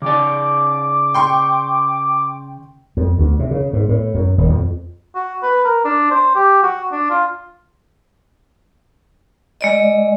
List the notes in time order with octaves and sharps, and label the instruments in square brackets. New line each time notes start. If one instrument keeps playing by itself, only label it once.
[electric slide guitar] C#3 D5 [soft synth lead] D6
[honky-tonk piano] G5 C6 C#6
[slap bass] F2
D2
C3
C#3
G#2
A2
F#2
D#1
F2
[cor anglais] F#4
B4
A#4
D4
C5
G4
F#4
D4
F4
[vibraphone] G#3 D5 D#5